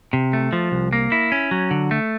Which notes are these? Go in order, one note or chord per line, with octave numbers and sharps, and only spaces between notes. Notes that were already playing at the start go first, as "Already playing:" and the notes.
C3
A3
F3
C2
A#3
E4
C#4
F#3
D3
A3